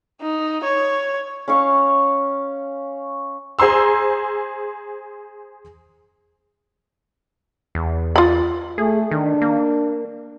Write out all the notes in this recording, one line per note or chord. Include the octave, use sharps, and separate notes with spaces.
D#4
C#5
C#4 F5 C#6
G#4 C5 A#5 C6 E6
E2
F4 B5
A3 G#4
D#3 D4
A#3